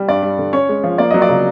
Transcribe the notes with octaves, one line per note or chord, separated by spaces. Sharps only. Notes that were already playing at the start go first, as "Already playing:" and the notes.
Already playing: G3
G2 D5
G3
D3
C#4 C#5
G#3
F3
A#3 D5
F#3 D#5
D5
C#3